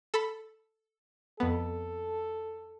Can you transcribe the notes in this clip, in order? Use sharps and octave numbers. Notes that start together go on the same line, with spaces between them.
A4 B5
F2 B3 A4